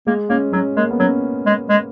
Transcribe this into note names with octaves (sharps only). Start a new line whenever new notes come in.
G#3 A#3
A#3 C#4
F#3 C#4
G#3 A#3
B3
F#3 C#4
G#3
G#3